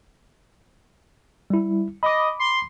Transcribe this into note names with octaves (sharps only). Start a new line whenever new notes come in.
G3 E4
D#5 B5 D6
C6